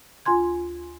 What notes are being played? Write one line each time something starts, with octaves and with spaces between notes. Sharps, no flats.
D2 F4 G#5 C6 G#6